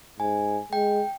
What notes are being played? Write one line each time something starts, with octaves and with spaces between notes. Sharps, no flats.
G#2 G#5
G#3 G5